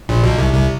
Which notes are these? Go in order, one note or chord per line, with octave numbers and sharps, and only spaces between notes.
A#1 A#2
B1 B2
C2 C3
C2 C3